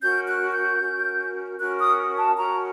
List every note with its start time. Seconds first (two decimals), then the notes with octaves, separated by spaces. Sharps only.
0.01 C#4 F#4 A#4 G6
0.28 F#6
0.53 G6
0.80 C#4 F#4 A#4
1.58 C#4 F#4 A#4 F#6
1.78 D#6
2.17 A5
2.36 C#4 F#4 A#4 A#5